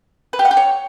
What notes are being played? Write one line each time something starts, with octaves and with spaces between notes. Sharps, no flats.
B4
G4
F#5
G4
C#5